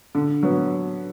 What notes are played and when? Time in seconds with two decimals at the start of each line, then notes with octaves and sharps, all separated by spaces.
0.15 D3
0.43 F#3 B3